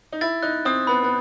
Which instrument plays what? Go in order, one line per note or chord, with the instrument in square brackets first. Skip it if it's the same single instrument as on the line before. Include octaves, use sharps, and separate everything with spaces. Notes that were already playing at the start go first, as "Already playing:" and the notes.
[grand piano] D#4
[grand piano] E4 [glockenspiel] A6
[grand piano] D#4 [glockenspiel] F#6
[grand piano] C4 [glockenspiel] D#6
[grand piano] B3 [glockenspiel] B5
[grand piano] B3